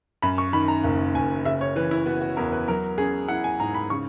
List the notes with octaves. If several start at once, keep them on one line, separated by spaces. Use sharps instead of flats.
F#2 B5
C#6
D#3 B5
A#5
F#1
F#1 G#5
C#3 E5
C#5
E3 B4
E4
B3 F#4
F#4
E2 A#4
B4
F#3 A#4
C#4 G#4
E4 F#5
G#5
G#2 A#5
B5
C#3 C#6